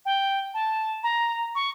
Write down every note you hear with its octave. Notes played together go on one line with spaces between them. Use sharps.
G5
A5
A#5
C#6